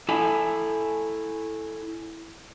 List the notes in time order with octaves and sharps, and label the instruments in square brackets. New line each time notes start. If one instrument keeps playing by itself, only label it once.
[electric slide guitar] E4 A4 G#5